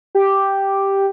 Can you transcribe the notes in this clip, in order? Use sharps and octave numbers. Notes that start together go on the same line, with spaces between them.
G4